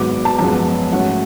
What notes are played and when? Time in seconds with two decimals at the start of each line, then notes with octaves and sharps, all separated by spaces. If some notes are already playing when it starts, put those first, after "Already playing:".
Already playing: G#1 G#2 F#3 B3 D6
0.25 A5
0.38 F#2 F3 G#3 B3 A5
0.92 G#2 F#3 A3 C#4 F#5